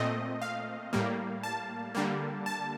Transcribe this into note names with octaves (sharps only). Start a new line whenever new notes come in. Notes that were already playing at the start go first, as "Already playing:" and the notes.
Already playing: A#2 A3 C4 D#5
F5
A2 G3 A#3
A5
D3 G3 A#3
A5